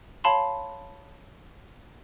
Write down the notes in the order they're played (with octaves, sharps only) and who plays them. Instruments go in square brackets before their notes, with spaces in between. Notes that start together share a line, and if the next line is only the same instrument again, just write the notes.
[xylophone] C#5 F5 A5 B5 C6